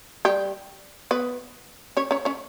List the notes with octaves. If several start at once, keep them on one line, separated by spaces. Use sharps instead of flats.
G3 G4
B3 B4
C#4 C#5
C#4 C#5
C#4 C#5